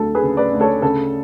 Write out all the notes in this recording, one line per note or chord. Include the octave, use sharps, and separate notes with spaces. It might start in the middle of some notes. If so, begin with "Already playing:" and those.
Already playing: D2 F#3 A4
G#4 B4
C#3
B4 D5
D2
A4 C#5
C#3 A4